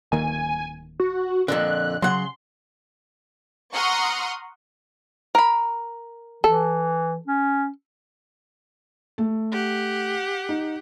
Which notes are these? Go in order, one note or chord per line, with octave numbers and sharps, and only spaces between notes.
D1 D#3 A#3 G#5
F#4
F2 A#2 D3 F#6
C#3 F#3 F#5 C6
F#5 A#5 C6 C#6 D#6 F6
A#4 B5
E3 A4
C#4
A3
G4 F#5
D#4